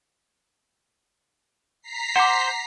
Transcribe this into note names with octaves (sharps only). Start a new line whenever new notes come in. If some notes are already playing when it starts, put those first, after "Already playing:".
A#5 B6 C7
C5 F#5 D6